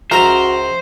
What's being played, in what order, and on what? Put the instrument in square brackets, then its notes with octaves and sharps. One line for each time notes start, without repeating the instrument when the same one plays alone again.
[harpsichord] C#2 E5 A#5 [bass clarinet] F#4 [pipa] A#4 [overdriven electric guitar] C5